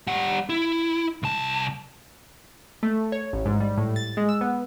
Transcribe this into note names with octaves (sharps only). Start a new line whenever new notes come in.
G3 F#5
E4
C2 A5
A3
C#5
A1
G#2
G3
A2
A6
G#3
E6
B3